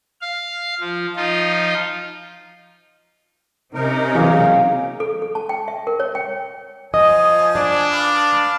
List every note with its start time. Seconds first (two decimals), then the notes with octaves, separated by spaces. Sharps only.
0.21 F5
0.80 F3
1.16 F3 D#4 F4
3.74 C3 C#4 D#4 A#4
4.15 E3 F#3 A#3 G#4
5.00 A4
5.22 A4
5.35 A5
5.49 G5
5.68 E5
5.87 A#4
6.00 C#5
6.15 G5
6.94 F3 D#5 G#5 D#6
7.55 D4 D5
7.92 B4 F5 D6